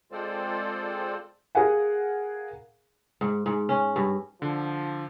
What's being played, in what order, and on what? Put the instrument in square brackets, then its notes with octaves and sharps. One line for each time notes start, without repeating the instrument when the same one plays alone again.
[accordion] G#3 C4 F4 A4 C5 D5
[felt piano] G#4 A#4 F5 F#5 G#5
[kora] G#2
G#2
C#4
G2
[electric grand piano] D3 [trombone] F3